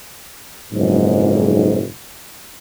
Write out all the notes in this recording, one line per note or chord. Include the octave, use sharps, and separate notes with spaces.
F#1 B1 F2 G#2